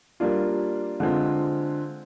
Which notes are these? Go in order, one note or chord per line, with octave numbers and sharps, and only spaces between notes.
G3 A#3 D4 F4
D3 G#3 C4 F4